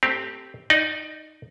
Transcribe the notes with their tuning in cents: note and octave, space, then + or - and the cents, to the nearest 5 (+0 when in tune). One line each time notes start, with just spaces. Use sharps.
A3 +25 C4 +0 G4 +0
D#4 +0 D5 +25